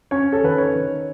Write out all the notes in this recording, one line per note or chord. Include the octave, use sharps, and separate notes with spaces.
C#4 C#5
A4
D#3 B4
C#5
D#3